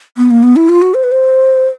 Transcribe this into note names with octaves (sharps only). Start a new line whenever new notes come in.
B3
A#3
B3
E4
F4
F#4
C5
B4
C5